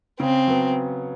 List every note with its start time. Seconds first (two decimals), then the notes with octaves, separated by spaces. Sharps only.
0.20 C#3 C4
0.47 F#3 B3